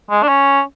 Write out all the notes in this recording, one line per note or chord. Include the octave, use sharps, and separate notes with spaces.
G#3
D4
C#4